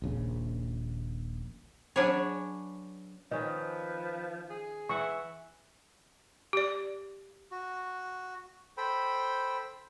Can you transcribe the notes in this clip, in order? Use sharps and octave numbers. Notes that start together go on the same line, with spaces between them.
D#1 A#1 C#3
F#3 C#4 D4 G#4 B4 C#5
D#3 F3 C#4 B4 D#5
G#4
E3 E5 F#5 C#6
G4 D5
F#4
A4 C5 G5 B5